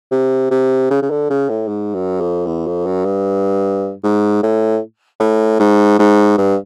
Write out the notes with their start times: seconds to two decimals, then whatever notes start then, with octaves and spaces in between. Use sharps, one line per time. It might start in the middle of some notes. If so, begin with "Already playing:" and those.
0.11 C3
0.51 C3
0.91 C#3
1.02 C#3
1.10 D3
1.30 C#3
1.49 A2
1.68 G#2
1.95 F#2
2.21 F2
2.46 E2
2.67 F2
2.86 F#2
3.05 G2
4.04 G#2
4.43 A2
5.20 A2
5.60 G#2
5.99 G#2
6.38 G2